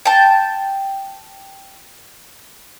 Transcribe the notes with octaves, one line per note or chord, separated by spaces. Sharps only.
G5 A5